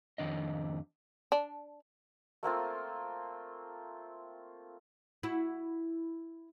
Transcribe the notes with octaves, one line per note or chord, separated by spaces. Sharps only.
F2 G#2 D#3 D4 D#5
D4
A3 A#3 C4 F4
E4 F#4